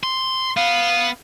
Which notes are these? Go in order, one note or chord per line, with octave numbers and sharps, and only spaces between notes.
C6
B3 F5